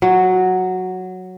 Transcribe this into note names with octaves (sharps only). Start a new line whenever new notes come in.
F#3